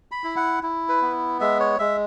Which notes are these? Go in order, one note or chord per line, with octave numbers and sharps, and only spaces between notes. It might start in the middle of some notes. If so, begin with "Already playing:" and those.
B5
E4
F#5
E4
B4
B3
G#3 E5
C#5
G#3 E5